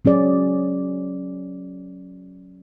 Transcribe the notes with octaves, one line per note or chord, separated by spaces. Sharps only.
F#3 C#4 G#4 D5